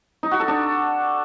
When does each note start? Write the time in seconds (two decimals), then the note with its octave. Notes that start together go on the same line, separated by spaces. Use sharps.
0.23 D#4
0.31 F#4
0.40 A4
0.48 D4